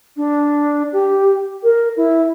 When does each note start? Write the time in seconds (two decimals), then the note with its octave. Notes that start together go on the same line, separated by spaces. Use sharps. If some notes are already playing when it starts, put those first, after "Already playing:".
0.17 D4
0.93 G4
1.63 A#4
1.97 E4